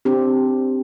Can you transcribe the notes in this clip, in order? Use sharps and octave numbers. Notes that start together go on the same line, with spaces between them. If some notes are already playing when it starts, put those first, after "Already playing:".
C4 D4 G4